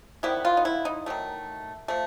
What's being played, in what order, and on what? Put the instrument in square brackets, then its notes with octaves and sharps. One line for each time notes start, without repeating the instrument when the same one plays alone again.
[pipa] C3 D#3 G3 B3 E4
F4
D#4
E4
D#4
D#3 F#3 A3
F3 A3